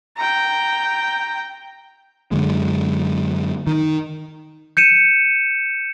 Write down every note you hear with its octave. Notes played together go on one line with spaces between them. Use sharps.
G5 A#5
F#2 D3 G#3
D#3
G6 C#7 D#7 E7